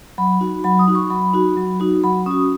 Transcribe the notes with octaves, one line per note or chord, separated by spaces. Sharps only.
F#3 B5
D#4 F#4
F#3 B5
D#6
D#4 F#4
C#6
F#3 B5
D#4 F#4
F#3
D#4 F#4
F#3 B5
C#4 F#4 D#6